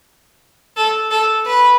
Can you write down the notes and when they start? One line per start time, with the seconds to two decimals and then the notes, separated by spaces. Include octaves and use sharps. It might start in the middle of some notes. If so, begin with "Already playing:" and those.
0.77 A4
1.11 A4
1.46 B4